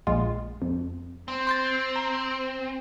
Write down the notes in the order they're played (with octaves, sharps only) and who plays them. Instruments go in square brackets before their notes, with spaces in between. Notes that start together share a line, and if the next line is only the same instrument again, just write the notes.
[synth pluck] A#1 G#3 F4
F2
[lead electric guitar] C4
[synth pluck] C6 G6 A6
A#5